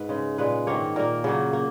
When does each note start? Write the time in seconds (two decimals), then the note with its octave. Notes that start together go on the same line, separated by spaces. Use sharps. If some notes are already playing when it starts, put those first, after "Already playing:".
Already playing: G#2 B4
0.09 C#3 G#3
0.38 A#2 G#3 B4
0.67 G#2 D#3 A#3 C#5
0.96 A#2 A#3 A#4
1.24 C#3 F#3 A#3
1.53 A#3